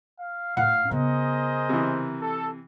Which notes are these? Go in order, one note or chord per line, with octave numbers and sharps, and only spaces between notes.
F5
A2 F5 F#5
C#3 B3 G#4 A#4 C5 D#5
C3 E3
A4